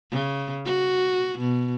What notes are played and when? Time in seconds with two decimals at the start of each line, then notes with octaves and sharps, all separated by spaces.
0.11 C#3
0.65 F#4
1.39 B2